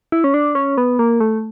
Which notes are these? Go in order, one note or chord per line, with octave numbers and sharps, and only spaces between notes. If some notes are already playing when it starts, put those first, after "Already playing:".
E4
C#4
D4
C#4
B3
A#3
A3